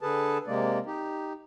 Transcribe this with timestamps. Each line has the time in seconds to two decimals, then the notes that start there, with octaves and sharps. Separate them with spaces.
0.01 D3 G#4 A4 B4 A5
0.47 C3 G#3 A#3 D5
0.86 D#4 G4